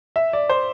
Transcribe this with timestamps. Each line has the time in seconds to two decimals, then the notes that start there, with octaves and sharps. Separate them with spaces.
0.16 E5
0.33 D5
0.50 C5